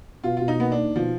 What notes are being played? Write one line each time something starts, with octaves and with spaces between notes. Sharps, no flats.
B2 F4
B2 F4
D#4
A#3 B3
D4
D#4
B2 F3